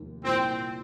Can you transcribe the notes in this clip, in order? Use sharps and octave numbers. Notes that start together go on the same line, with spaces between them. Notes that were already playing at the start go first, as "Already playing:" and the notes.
Already playing: F1 D#2
C2 A#2 F3 A#3 C4